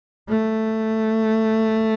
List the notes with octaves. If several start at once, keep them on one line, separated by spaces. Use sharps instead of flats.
A3